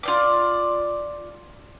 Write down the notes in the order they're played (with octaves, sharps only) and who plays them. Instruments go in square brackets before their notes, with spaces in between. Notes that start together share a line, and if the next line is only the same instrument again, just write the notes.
[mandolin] F4 D5 D6